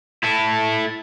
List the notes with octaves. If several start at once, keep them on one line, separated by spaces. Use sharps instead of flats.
E4 A4